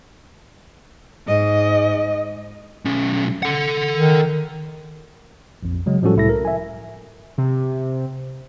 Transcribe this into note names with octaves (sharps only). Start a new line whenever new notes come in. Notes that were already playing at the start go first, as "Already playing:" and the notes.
G#2 D#5
B1 C#4
A4 F#5
D#3
A#1 F2
C#3 F#3 G#3
A2 F3 G3 C#4 F#4 A4
C2 A2 E4 A4 A#6
A#4
E5 G#5
C3